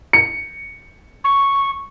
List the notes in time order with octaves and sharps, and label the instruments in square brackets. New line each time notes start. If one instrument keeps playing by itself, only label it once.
[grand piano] C#7
[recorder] C#6